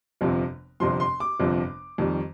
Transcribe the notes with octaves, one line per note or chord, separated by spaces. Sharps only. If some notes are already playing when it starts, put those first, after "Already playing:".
G1 F2 C3 F3
G1 F2 C3 F3 C6
C6
D6
G1 F2 C3 F3
F2 D#3 G3